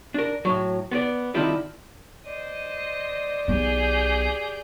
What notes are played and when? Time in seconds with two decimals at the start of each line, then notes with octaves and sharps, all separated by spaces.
0.14 D4 A#4
0.45 A2 F#3
0.91 B3 B4 D5
1.34 D3 D#3 G3 C4 E4 F4
2.26 C5 D5 D#5
3.48 B1 B3 G4 G#4 G6